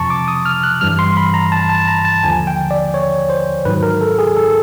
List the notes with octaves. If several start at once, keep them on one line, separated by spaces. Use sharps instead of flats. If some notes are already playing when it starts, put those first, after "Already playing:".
Already playing: F2 C3 F3 A5 A#5 C#6
D6
D#6
F6
F#6
G2 E3 G3 F6
C6
B5
A#5
A5
A5
A#5
A5
D#2 D3 F3 G#5
G5
D5
C#5
C5
G#2 D#3 F#3 B4
A#4
A4
G#4
A4